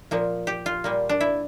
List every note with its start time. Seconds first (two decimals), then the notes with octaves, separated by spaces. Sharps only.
0.11 A#2 F3 A#3
0.47 G4
0.66 F4
0.84 A#2 G3 A#3
1.09 D4
1.21 E4